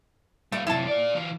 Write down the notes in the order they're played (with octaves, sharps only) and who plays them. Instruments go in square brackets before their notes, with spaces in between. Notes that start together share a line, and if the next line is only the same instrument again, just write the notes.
[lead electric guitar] G3 F4 [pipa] A3
[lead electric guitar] F#2 C3 [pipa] E4 A5
[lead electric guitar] F4 D5
E3 F4